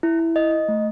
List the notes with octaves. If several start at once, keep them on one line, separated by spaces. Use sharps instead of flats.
E4
E4
D#5
D#5
A3